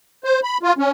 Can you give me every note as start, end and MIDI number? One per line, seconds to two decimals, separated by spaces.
0.24 0.40 72
0.43 0.58 83
0.63 0.73 65
0.78 0.91 61